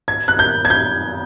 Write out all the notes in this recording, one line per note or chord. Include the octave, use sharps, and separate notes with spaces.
G#6
F#6
G6
G#6
G6